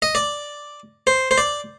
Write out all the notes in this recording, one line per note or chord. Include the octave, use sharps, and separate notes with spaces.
D#5
D5
C5
C5
D5